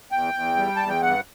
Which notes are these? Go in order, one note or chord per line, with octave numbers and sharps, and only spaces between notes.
E2 G5
E2
G3
E2 A5
G5
G2 F#5